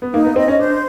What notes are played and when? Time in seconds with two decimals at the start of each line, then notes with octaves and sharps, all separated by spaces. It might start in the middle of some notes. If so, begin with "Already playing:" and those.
0.02 B3
0.14 A#3 D#4
0.25 B3
0.36 C4 D#5
0.48 C#4
0.59 D4 C5